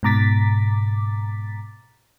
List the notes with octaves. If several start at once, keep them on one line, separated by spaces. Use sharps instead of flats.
G#2 B2 A#5 D6 A6 B6